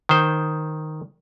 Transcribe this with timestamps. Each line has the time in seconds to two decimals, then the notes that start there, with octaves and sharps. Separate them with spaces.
0.09 D#3 C5